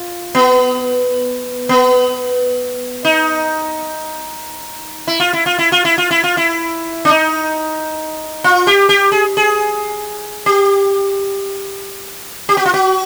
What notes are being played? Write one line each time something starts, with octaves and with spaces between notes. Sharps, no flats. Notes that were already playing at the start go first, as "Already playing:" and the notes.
Already playing: F4
B3
B3
D#4
E4
F4
E4
F4
E4
F4
E4
F4
E4
F4
E4
D4
D#4
F4
G4
G4
G#4
G#4
G4
G4
F#4
F4
F#4